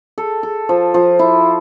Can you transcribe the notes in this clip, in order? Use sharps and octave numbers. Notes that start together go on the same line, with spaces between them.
A4
A4
F3
F3
E4